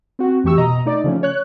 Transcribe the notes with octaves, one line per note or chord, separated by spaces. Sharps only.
C4 F#4
F2 E3 A3 G4 C#6 E6
B2 D#5 A#5
A3 D#4 D5
C#3 F3 A3 C#4
C#5 F#6